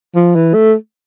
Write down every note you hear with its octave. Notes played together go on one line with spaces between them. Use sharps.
F3
E3
A3